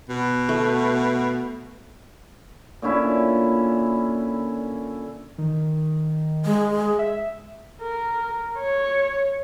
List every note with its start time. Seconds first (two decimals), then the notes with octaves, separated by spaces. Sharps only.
0.09 B2
0.49 A3
2.82 A#2 D3 C#4 E4
5.38 D#3
6.45 G#3
6.99 E5
7.82 A#4
8.59 C#5